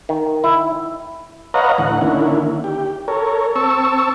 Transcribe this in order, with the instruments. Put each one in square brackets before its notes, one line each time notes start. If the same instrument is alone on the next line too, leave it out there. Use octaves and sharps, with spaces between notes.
[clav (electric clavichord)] D#3
E4
[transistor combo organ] B4 C#5 D#5 F5 F#5 A#5
D2 A2 E3 F#5
D3 D#3 A#3 C#4 E4
G4
A4 A#4 C#5
C4 A5 C#6 E6